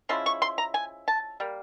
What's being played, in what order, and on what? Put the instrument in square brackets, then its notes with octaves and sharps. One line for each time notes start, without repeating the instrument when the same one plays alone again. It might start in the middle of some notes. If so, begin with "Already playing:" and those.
[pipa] F3 G#3 C#4 E4 C6
C#6
C6
A#5
G#5
A5
G3 A#3